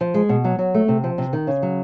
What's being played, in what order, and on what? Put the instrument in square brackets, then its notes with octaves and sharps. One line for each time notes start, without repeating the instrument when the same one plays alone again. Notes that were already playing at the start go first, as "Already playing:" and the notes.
[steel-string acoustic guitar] F3
G#3
B2
F#3
F#3
A3
C3
F3
C3
D#3
C#3
F#3